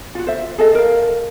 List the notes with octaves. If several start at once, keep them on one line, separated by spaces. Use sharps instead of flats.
F4 F#4
C5 E5
G#4 A4 D#5
A#4 F5